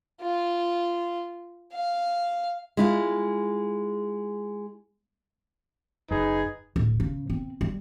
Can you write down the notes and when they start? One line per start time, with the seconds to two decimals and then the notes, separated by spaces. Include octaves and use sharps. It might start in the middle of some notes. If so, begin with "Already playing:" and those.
0.21 F4
1.74 F5
2.77 G#3 E4 F4
6.11 F#1 F#2 D#4 G#4 B4
6.76 D1
7.00 C#3
7.30 C4
7.61 G3